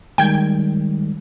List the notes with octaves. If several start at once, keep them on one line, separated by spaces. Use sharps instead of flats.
D#3 G3 G#3 G5 G#6